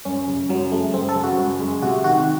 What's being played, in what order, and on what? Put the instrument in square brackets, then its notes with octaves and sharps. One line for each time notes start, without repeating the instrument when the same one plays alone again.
[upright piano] F#2 [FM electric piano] C#4
[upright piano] C#3
[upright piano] F#2 [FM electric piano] F#3
[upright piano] G#3 [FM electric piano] A3
[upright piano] F#2 [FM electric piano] C4
[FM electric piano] A4
[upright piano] C#3
[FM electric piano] F#4
[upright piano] F#2
G#3
[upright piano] C3 [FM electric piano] F#4
[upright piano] D#3 [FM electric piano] F#4